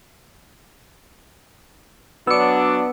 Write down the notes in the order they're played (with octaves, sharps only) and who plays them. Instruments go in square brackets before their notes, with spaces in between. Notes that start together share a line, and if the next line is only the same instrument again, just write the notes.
[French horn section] F#3 D4 F#4 [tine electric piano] B3 C#7 [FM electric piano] D6 E6